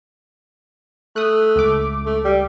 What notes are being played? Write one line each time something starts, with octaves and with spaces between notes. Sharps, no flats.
A3 D#6 F#6
C#2 D6
A3
G3